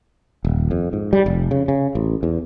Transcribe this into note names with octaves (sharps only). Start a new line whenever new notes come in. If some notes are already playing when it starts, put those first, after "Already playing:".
D#1
F2
G#2
G3
F1
C#3
C#3
A1
E2